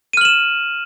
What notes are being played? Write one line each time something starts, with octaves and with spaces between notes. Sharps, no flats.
F6 D#7 E7 F#7